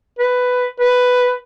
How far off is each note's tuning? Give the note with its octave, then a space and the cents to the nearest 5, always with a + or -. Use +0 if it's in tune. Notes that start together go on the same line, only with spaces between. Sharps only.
B4 +10
B4 +5